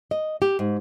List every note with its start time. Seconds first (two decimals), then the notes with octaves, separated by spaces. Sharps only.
0.11 D#5
0.42 G4
0.59 G#2